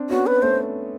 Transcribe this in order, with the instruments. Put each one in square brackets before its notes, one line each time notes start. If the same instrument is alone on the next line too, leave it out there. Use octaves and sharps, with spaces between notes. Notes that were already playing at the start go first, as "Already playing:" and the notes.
Already playing: [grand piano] C4 D4
[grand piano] B3 C#4 [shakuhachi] F#4
[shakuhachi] B4
[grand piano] A3 B3 [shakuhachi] C5